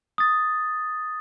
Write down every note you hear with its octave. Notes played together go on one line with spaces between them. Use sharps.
D#6 A6